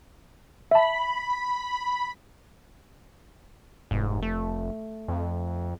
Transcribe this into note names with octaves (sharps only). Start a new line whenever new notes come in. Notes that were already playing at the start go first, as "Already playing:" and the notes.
E5 A5 B5
F1 G#2
A3
F2